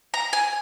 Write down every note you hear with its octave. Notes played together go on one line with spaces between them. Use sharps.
A#5
G#5